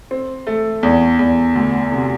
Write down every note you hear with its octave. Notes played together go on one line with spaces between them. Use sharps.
C4
A3
E2
E2
D2
C3